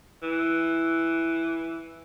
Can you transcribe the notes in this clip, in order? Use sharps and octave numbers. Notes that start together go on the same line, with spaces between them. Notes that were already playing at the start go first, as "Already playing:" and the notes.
E3